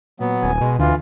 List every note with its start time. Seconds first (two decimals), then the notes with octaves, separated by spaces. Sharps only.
0.20 A#2 F#3 B3
0.43 D#1 G#5
0.61 B2 G#3
0.79 D2 D3 E3 F4